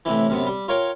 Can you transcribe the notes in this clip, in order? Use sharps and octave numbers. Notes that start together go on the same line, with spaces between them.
A2 C3 E3
F#2 C3 B3
G3
F4 A#4 C#5 F5 G5